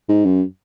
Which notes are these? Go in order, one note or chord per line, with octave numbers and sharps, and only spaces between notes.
G#2
F#2